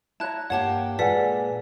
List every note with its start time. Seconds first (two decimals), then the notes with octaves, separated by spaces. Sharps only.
0.20 E4 C#5 A5 A#5 F#6
0.50 G2 A#3 G4 C#5 F#5 A5
0.99 A#2 G#3 A4 B4 D5 F#5 G#5 B6